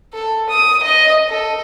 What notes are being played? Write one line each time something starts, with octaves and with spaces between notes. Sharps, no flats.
A4
D#6
D#5
A4